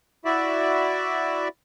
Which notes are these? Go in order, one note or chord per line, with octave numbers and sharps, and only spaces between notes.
E4 F#4 D5 E5